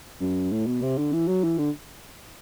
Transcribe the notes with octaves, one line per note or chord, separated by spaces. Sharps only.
F#2
A2
B2
C3
D3
E3
F#3
E3
D3